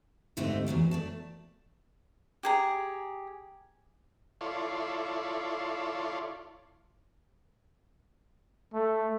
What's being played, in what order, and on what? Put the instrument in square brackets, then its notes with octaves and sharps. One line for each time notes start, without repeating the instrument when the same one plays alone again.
[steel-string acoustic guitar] D2 G#2 A3 C4 D#4 G4
E2 A#2 F#3 D4
A3 D5 A5
[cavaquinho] G4 G#4 A#5
[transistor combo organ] E4 F4 A4 C#5 D5 C6
[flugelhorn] A3